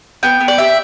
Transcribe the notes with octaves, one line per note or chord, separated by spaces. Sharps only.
B3 G5
B3
D5
G4 E5